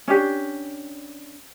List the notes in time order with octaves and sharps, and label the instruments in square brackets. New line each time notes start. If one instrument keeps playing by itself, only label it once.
[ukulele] C#4 D4 G4